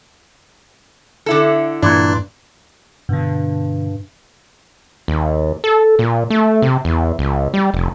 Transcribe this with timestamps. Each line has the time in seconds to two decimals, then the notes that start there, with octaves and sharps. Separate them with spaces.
1.26 D3 E4 A4
1.83 G2 A#2 E3 D4
3.09 G2 B2 D3
5.08 D#2
5.64 A4
5.99 A#2
6.30 A3
6.62 C3
6.85 E2
7.19 C#2
7.54 G3
7.74 F1